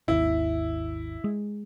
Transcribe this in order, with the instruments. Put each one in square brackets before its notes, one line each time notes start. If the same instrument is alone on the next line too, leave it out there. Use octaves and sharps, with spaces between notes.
[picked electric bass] G#1 D#2 [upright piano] E4
[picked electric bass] G#3